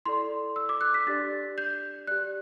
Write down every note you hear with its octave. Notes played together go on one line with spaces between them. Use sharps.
E4 A4 D5 C6
E6
D6
F#6
B6
D4 G4 D5 A6
G6
G4 D5 F#6